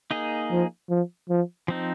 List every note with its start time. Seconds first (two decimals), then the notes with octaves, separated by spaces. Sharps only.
0.11 A#3 D#4 G#4 D#5
0.51 F3
0.89 F3
1.29 F3
1.68 F3 C4 D#4